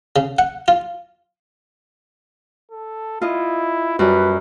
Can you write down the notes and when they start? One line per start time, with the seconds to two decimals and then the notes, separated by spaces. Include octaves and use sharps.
0.16 C#3
0.39 F#5
0.68 F4
2.71 A4
3.22 E4 F4 D#5
3.99 F#2 G3 B4